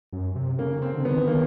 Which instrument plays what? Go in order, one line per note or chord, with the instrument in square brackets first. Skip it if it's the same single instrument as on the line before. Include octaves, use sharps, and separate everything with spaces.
[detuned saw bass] F#2
C3
[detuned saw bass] C#3 [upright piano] A#3
[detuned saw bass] C#3
[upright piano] C4
[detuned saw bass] D3
[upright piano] B3
[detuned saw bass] D#3
D3
[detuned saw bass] D#3 [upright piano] A#3